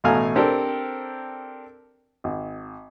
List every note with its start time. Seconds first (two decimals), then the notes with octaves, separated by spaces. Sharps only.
0.04 A1 B2 A3 F5 G#5 A#5
0.35 C4 D4 G4 A4 A#4 C5
2.24 G#1